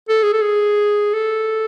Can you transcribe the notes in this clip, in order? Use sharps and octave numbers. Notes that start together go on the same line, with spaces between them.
A4
G#4
A4
G#4
A4